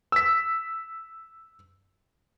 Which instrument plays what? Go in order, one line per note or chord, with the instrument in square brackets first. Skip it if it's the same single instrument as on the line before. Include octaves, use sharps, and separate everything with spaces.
[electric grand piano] E6 B6